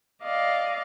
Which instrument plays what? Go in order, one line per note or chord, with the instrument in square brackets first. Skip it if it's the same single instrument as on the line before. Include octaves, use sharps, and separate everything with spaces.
[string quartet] D5 D#5 F5